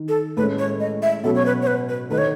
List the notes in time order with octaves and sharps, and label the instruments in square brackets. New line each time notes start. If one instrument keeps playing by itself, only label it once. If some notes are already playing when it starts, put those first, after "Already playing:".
Already playing: [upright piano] D#3
[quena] A4
[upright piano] A2 [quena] B4
[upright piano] G#3 C#4
[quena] C#5
D#5
E5
[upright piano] B2 F#3 C#4 [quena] A4
[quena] C#5
B4
C#5
B4
B4
[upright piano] D#3 A3 D#4 [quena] B4
[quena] C#5